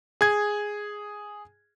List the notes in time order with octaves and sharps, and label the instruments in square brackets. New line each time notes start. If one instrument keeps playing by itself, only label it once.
[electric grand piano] G#4 G#6